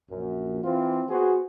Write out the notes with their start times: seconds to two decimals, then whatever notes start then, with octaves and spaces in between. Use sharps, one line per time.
0.10 A#1 F#2
0.63 E3 C4 F4
1.09 B3 F#4 G#4 C5